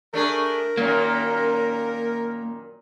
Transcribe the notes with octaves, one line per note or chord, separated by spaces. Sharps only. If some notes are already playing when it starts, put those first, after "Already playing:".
A3 D4 G#4 A#4
F#2 A#2 D#3 A#3